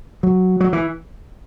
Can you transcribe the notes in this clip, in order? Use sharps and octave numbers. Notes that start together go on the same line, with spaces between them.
F#3
F#3
E3